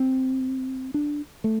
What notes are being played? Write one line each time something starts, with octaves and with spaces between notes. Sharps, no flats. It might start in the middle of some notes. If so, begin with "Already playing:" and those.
Already playing: C4
D4
A3